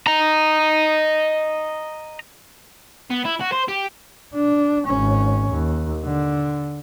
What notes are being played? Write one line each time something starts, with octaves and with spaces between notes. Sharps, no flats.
D#5 A#5
B3
E4
F#4
C5
G4
D4
G#1 C#4
D#2
D3